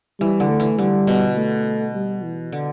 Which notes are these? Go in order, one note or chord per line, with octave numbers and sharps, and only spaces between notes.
E3 G3
D3
A3
E3
D3 G3
B2
A3
G3
E3
D3